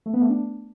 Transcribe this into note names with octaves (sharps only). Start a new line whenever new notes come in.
A3
B3
A3
D4